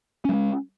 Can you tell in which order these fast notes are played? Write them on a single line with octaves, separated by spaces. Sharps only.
C#4 G3 G#3